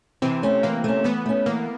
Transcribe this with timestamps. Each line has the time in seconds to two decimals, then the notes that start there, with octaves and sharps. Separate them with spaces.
0.22 C3 E3 C4
0.43 A3 C#4
0.63 E3 A#3
0.84 A3 C#4
1.04 E3 B3
1.26 A3 C#4
1.46 E3 A#3